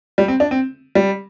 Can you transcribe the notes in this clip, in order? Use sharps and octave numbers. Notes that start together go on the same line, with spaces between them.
G3
C4
D4
C4
G3